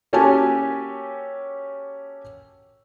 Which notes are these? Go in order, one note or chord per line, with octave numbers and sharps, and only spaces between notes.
A#3 C#4 F#4 G4 A4 G#5